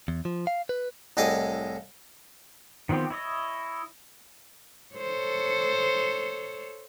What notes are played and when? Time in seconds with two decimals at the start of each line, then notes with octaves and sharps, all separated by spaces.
0.08 E2
0.25 F3
0.47 F5
0.69 B4
1.17 C2 A2 G#4 D#5 D6
2.89 D#3 F3 B3 C4 G4
3.10 E4 C#5 D#5
4.95 A4 C5 C#5